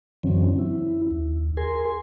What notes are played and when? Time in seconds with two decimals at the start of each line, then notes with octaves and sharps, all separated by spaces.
0.23 F#2 D3 E3 F#3 C4 C#4
0.59 E4
1.11 D#2
1.57 G#4 A#4 G#5 C6